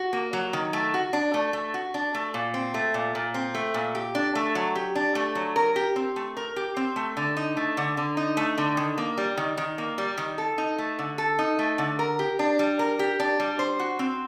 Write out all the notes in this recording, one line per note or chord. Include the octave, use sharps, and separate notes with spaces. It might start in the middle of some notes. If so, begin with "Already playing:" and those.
Already playing: F#4
A#3
F#3
D#3
A3
F#4
D4
A3
A3
F#4
D4
A3
A#2
C4
A3
A#2
A#2
C4
A3
A#2
G4
D4
A3
F#3
G4
D4
A3
F#3
A#4
G4
C4
A3
A#4
G4
C4
A3
D3
D#4
A3
D3
D3
D#4
A3
D3
D#3
A#3
G3
D#3
D#3
A#3
G3
D#3
A4
D#4
A3
D3
A4
D#4
A3
D3
A#4
G4
D4
G3
A#4
G4
D4
G3
C5
F#4
C4